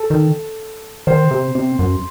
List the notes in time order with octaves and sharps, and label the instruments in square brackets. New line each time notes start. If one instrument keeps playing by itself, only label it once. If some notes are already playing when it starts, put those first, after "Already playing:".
Already playing: [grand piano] A4
[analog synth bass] D#3
[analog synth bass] D#3 [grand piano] C5
[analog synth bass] C3
C3
F#2